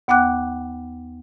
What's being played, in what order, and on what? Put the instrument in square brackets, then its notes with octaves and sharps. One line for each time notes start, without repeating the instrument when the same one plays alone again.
[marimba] D#2 B3 F#5 G5 D6 F#6